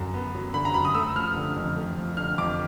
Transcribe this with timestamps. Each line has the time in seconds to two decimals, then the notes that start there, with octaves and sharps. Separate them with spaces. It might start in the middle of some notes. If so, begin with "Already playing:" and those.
Already playing: F#2 D3
0.14 B3
0.35 F#3
0.54 D3 B5
0.65 A#5
0.74 F#2 B5
0.85 D#6
0.95 A3 E6
1.15 F3 F6
1.36 D3
1.56 F2
1.76 A3
1.98 F3
2.17 D3 F6
2.38 F2 D6